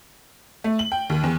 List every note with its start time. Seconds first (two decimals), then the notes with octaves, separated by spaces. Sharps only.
0.64 A3
0.79 F#7
0.92 G5
1.10 D#2
1.24 E2